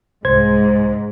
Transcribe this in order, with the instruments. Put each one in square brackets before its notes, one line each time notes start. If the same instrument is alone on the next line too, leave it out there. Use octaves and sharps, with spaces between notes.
[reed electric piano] C2 C5 G#6 [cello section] G#2